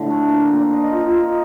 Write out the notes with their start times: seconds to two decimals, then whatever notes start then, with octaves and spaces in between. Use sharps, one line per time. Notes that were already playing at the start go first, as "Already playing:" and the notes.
Already playing: A2 D3
0.10 A3
0.29 A#3
0.47 C4
0.60 D4
0.73 D#4
0.87 F4
1.00 F4
1.18 D#4